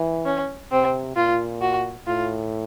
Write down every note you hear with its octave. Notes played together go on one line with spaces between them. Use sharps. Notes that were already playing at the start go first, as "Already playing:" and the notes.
Already playing: E3
C#4
C3 C4
A#2 F4
F#4
A2 F4